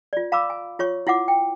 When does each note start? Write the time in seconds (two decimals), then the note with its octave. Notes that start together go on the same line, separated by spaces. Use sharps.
0.13 F4 D5
0.32 F5 A#5 B5 D6 E6
0.50 G#5
0.79 F4 C#5 C#6
1.07 E4 F4 F#5 D6
1.28 G5